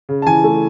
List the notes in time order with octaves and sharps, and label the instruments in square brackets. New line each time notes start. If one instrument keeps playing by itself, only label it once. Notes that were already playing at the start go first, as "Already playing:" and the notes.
[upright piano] C#3
A5
E3 G#5
A3